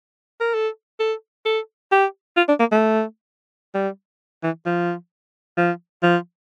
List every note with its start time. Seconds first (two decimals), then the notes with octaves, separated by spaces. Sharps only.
0.41 A#4
0.54 A4
1.00 A4
1.45 A4
1.92 G4
2.37 F4
2.49 D4
2.60 A#3
2.72 A3
3.75 G3
4.43 E3
4.66 F3
5.57 F3
6.03 F3